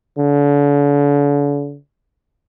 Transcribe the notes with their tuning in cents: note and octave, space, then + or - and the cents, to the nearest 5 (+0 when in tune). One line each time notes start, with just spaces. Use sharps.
D3 -40